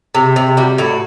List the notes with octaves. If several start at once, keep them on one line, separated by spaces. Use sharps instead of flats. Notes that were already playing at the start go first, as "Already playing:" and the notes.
C3
C3
G3 F#4
A2 F#4